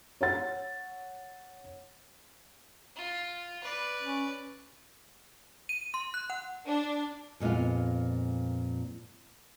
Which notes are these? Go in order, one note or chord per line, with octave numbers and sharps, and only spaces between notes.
C#5 F#5 A6
F4
B4 D5
C#4
D#7
C6
F#6
F#5
D4
F2 A#2 G#3 B3 F4